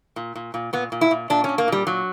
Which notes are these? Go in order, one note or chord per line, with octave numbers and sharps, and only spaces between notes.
A#2
A#2
A#2
A#2 B3
A#2
E4
A#2
A#2 D4
A#2 C#4
A#3
A#2 G3
A#2 F#3